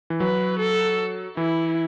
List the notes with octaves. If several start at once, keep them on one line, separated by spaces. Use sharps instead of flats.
E3
F#3 B4
A4
E3 E4